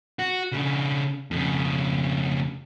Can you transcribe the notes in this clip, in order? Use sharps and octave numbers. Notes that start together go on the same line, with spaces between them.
F#4
C#3 D4
F2 C#3